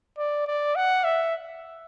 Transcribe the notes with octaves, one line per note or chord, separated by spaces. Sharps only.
D5
D5
F#5
E5